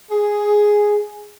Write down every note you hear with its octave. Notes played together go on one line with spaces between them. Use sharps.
G#4